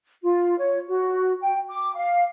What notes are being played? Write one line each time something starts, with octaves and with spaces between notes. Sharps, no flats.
F4
C#5
F#4
G5
D6
F5